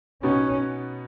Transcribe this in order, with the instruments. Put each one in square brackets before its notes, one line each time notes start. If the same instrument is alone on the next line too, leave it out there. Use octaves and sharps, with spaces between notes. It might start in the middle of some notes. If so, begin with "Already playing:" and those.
[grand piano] B2 B3 D#4 [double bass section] C#4